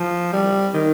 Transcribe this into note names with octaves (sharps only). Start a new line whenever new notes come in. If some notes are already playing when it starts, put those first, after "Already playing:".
Already playing: F3
G3
D#3